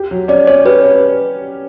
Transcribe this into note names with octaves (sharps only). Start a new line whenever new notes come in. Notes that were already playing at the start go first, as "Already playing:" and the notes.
Already playing: G4
F#3
C#4 D5
C#4 C#5
G4 B4
C#4